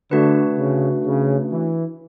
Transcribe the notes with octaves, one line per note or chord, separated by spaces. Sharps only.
D3 A3 D4 F#4 B4
C#3
C#3
E3